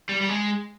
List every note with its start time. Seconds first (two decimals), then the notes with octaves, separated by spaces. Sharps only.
0.09 G3
0.21 G3
0.29 G#3